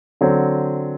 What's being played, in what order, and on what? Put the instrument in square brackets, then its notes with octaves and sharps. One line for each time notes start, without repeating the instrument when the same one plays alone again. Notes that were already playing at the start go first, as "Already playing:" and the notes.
[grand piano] D3 F#3 C4